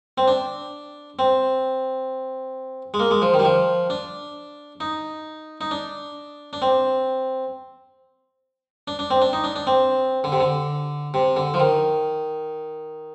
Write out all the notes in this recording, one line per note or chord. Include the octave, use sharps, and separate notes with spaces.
C4
D4
C4
G#3
A#3
G#3
F3
D#3
G3
F3
D4
D#4
D#4
D4
D4
C4
D4
D4
C4
D4
D#4
D4
D4
C4
D3
C3
D3
C3
D3
F3
D#3